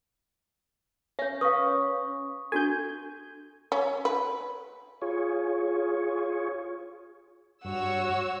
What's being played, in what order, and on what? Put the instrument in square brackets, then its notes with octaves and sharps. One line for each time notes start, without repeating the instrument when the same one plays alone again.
[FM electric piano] C#4 [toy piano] C#5 E5
[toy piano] B4 F5 [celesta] C#6 D#6
[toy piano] D4 F#4 A4 [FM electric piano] G#5 G6
[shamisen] C#4
B4
[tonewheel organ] F4 G#4 C#5
[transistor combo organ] G2 [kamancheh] F#4 [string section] C#5 E6